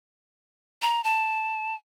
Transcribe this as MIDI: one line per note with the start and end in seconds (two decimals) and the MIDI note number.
0.82 1.03 82
1.04 1.75 81